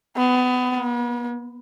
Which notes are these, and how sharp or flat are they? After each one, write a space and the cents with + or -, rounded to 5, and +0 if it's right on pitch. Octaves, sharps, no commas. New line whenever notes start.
B3 +25
B3 -40